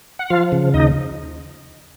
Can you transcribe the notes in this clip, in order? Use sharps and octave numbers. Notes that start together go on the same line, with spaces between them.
F#5
F3 F4 F5
C#3
D#2 D#4 D#5